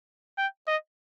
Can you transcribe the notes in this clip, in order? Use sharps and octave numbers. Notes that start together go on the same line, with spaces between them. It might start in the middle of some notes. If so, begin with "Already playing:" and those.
G5
D#5